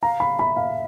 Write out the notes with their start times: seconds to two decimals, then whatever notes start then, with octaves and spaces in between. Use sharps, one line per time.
0.03 F5 A#5
0.20 B5
0.39 E5 B5
0.56 F5